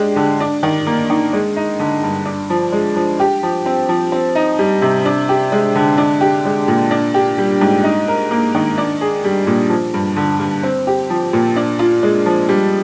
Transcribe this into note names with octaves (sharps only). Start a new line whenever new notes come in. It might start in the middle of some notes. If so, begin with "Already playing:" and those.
Already playing: G#3 D4 G4
D3
D4
D#3
A#3
D#3
G#3
D#4
D3
G2
D4
F3
G#3
F3
G4
F3
C4
F3
C4
D#4
G3
C3
D4
G4
G#3
D3
D4
G4
G#3
A#2
D4
G4
G3
G#2
D#4
A#4
A#3
D#3
D4
G#4
G3
A#2
F3
G2
D3
G2
C4
G4
F3
A#2
D4
F4
G#3
F3
G3